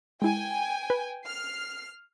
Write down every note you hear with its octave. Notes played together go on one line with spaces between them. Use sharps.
G#3 E4 G5 G#5
B4
F6 C7